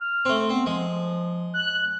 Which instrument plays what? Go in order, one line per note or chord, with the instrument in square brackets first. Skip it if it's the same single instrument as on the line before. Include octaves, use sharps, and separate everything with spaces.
[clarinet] F6
[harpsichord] A3 C4
[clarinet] B3 [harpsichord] C4
[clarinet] F3 [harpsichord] G#3
[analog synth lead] F#6